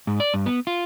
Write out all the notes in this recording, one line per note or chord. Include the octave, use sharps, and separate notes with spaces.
G#2
D5
G2
B3
F4